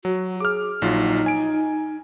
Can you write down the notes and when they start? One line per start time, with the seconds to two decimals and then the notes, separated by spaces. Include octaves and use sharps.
0.05 F#3 F#4
0.40 G#4 D6 F6
0.82 A#1 F#3 D#4 F4
1.26 G#5 D7